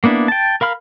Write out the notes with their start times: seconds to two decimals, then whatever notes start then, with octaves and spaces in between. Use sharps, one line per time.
0.04 A#3 B3 D4 E4
0.28 G5 A5
0.61 A#4 F5 B5 F6